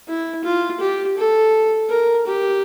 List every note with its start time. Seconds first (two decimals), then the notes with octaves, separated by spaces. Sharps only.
0.08 E4
0.44 F4
0.80 G4
1.17 A4
1.89 A#4
2.26 G4